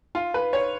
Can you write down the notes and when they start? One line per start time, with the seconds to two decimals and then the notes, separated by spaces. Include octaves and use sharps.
0.15 F4
0.34 B4
0.53 C#5